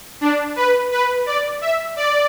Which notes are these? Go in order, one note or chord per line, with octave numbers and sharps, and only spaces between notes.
D4
B4
B4
D5
E5
D5